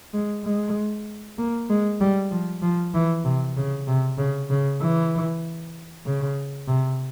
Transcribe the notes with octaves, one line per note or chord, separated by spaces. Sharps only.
G#3
G#3
A#3
G#3
G3
F3
F3
E3
C3
C#3
C3
C#3
C#3
E3
C#3
C3